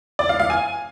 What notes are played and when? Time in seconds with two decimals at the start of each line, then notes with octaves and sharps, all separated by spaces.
0.19 D5
0.29 F5
0.40 F5
0.50 G#5